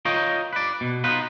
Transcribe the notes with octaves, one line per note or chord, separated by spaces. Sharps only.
F4 A#4 C#5 D#5 G5
B4 D5
B2
B3 D#4 F4 B4